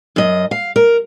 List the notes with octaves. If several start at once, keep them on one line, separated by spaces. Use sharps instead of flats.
F#2 D#5
F5
A#4